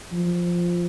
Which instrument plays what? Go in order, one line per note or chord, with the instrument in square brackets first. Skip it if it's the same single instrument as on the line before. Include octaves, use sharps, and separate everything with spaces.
[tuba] F3